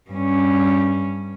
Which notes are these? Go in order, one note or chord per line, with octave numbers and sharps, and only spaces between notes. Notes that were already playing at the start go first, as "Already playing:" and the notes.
G2 C#4